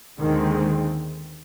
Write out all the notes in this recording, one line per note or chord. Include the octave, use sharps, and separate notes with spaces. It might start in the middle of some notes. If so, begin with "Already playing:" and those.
D#2 D3 D#3 G#3 C4